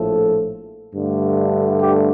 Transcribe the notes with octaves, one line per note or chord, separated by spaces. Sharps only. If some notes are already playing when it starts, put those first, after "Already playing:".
Already playing: A#1 A2 F3 A3 A4
G2 D3 A3
G4